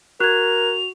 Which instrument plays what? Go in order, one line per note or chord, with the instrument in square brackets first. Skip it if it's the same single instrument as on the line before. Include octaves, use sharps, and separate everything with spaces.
[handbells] F#4 [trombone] A#4 [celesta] F#6 G#6 [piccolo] F7